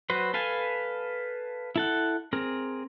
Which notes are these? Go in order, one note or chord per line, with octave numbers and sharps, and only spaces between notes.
F#3 F#4 B4 C5
A4 B4 F5 G#5 A5
E4 A4 F#5
C4 G#4 A#4